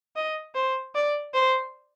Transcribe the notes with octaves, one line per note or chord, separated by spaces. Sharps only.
D#5
C5
D5
C5